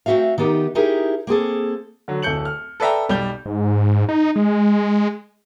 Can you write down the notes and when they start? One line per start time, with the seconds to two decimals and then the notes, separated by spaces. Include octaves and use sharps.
0.06 A3 C4 D#4 F#4 E5 F5
0.38 D#3 B3 D#4 G4
0.75 D#4 E4 G4 G#4 A#4
1.27 A#3 C4 G#4 A4
2.08 D3 F#3
2.22 D1 A4 G6 C#7 F#7
2.45 F6
2.80 A4 B4 D5 E5 G5 A#5
3.09 B1 G3 G4 D5 G6 G7
3.46 G#2
3.87 G#2
4.09 D#4
4.36 G#3